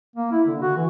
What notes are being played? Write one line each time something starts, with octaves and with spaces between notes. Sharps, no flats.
A#3
E4
D3
F#4
E3